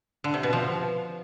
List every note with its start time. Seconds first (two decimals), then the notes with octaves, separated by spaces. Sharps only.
0.24 D3
0.34 C3
0.43 B2
0.53 F3